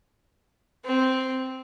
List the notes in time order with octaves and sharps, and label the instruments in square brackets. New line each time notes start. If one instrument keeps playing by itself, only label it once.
[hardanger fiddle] C4